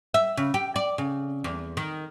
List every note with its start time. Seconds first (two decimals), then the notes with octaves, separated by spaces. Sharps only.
0.14 E5
0.37 C#3
0.54 G4
0.76 D5
0.98 C#3
1.44 E2
1.77 D#3